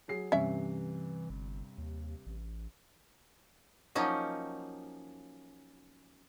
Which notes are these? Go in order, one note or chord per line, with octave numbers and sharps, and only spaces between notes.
F#3 G#4 C7
G2 C3 E3 C#4 E5
G1
D#2
A1
F3 F#3 A#3 C#4 D#4